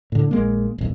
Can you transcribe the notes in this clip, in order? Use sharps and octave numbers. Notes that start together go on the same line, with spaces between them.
A2 D3
A#1 G#3 A#3
D#1 B1